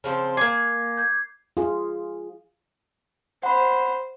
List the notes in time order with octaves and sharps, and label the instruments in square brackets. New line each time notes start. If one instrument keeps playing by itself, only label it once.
[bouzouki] C#3 F3 C4
[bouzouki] A#3 G#5 [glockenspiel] D6 G#6 C7
[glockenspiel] G6 G#6
[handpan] F4 G#4
[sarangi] C5 [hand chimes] F#5 B5